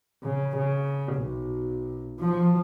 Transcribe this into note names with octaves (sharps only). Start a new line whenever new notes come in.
C#3
C#3
B1
F3